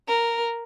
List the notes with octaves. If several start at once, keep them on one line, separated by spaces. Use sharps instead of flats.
A#4